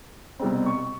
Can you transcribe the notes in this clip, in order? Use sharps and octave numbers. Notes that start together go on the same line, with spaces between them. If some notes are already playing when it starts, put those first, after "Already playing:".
C2 B2 G3 C4
C#6